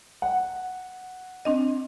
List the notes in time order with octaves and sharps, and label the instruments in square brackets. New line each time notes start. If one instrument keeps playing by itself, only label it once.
[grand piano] F#5
[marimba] C4 D4 D#5